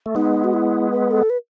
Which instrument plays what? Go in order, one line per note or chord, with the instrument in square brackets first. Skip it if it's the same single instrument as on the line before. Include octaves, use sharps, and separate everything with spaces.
[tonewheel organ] A3
[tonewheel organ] G#3 B3 [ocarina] D#4
[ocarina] F#4
E4
B4
A4
B4